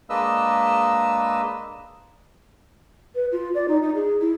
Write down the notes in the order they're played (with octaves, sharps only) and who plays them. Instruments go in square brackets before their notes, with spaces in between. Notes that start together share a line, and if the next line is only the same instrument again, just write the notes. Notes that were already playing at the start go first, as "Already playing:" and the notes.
[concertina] G#3 A#3 D4 B4 D#5 E6
[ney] B4
F4
D5
D#4
D#4
G#4
E4